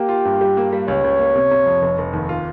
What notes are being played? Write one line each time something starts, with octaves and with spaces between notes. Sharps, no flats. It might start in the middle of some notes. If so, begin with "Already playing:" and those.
Already playing: A#3 G4
F4
G2
G3
A#3
G3
C#2 C#5
C#2
A#3
C3
C3
F2
F1
F1
D#2
F4